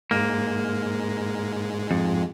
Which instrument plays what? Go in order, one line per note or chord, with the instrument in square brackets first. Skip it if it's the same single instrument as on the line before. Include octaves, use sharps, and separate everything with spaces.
[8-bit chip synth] G#2 G#3 [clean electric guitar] A#3
[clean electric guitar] F2